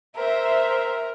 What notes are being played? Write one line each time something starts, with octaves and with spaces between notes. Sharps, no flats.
A#4 C5 E5